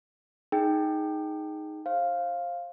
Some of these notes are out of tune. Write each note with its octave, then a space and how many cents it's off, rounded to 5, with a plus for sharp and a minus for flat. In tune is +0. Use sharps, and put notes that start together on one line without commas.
D#4 +0 G#4 +10 G5 +0
C5 +30 F5 +0